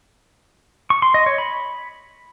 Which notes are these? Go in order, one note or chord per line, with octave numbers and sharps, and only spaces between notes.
C#6
C6
D#5
C#5
B5